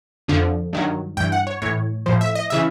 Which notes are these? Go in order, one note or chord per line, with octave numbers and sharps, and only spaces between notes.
F2 D3 F3
G2 D#3 F#3
G2 E3 G5
F#5
C#5
A2 E3 C#5
A2 F3 C5
E5
D#5
C#3 E3 E5